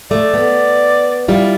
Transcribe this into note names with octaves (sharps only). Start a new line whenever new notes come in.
A3 D5
B3
G3 E4 F4